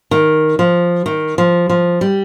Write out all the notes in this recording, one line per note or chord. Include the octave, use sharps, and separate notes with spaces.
D#3
F3
D#3
F3
F3
G3